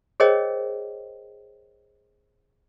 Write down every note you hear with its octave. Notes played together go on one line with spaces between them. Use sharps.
G#4 A#4 C5 C#5 D#5 G5